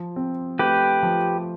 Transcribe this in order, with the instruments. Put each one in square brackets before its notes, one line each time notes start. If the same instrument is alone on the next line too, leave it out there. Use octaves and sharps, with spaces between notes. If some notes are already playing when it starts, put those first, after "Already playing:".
Already playing: [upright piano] F3
C4
[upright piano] A3 [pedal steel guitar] G4 B4
[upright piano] F3